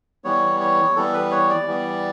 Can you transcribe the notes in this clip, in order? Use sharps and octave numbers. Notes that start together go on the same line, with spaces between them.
E3 G3 B3 C#5
C#5
E3 G3 B3 A4
B4
C#5
D5
E3 G3 B3